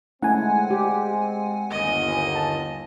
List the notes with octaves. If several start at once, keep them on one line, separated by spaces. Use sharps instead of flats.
G#3 A3 C4 C#4 E4 F#5 G#5
G4
G1 D#2 D#5
A5